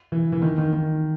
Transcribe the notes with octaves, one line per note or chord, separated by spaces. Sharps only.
E3
E3
D#3
D#3
D#3